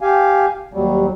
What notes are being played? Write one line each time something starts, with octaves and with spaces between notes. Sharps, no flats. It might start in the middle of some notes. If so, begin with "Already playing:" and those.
G4 F5 G#5
D#2 F#3 G3